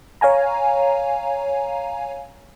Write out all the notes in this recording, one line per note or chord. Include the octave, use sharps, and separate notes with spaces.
C#5 F5 G#5 A#5